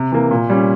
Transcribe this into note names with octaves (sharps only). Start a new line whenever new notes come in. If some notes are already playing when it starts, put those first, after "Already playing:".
Already playing: C3
E3 A#3
A#2
G3 C#4